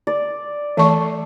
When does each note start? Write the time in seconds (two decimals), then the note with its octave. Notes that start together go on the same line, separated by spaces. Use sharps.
0.07 D5
0.77 E3 A3 C6 C#6